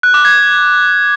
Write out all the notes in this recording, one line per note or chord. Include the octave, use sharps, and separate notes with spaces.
F#6
D6
G#6